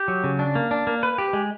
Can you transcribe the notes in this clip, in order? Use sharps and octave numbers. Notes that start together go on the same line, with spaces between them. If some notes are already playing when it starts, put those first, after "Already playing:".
Already playing: G4
F#3
C#3
D4
A#3
D4
A#3
B4
G4
G#3